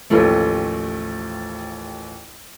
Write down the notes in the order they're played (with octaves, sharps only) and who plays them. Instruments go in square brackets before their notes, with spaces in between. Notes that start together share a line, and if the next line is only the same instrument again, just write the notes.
[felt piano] A1 D#2 F3 A3